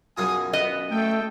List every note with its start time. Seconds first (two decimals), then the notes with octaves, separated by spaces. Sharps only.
0.17 B1 F#2 F4 G#4 G#5 D#6
0.53 B3 D#5
0.90 A3 A4 G5